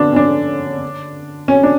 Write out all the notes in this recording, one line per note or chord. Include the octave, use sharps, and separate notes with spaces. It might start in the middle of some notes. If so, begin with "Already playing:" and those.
Already playing: D3 B3 D4
C#4
D4
C#4
D4